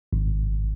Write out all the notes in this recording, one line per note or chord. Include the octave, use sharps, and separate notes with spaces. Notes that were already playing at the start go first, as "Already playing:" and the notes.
G#1